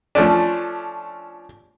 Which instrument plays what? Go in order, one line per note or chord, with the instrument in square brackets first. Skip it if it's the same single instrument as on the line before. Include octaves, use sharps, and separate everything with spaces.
[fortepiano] F3 A3 C#4 D4